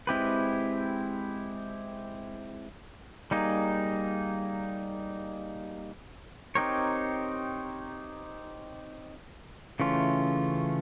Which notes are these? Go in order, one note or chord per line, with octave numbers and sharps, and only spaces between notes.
G#3 C4 E4 G4 B4
G3 A#3 D#4 G#4
C4 D#4 G4 A#4 C#5
C#3 E3 A3 C#4 F4